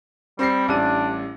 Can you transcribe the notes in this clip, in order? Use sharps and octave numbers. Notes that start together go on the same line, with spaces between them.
G3 C4 A#6 C7
A1 G3 D4 D#7